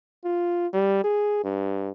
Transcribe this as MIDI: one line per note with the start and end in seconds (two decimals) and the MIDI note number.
0.24 0.67 65
0.74 1.00 55
1.04 1.44 68
1.44 1.90 43